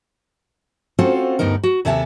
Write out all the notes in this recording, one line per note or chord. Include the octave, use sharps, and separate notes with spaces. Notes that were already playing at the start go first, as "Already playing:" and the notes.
C4 C#4 F4 F#4 A4 C5
D2 G2 B3 D#4 A#4
F#4
D#2 C3 A4 E5 G#5